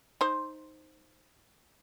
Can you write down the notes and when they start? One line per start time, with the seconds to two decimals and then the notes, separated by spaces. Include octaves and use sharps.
0.21 D#4 C5